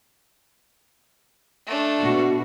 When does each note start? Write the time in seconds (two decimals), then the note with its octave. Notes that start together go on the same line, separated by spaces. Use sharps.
1.66 A3 D4
1.99 B2 F#4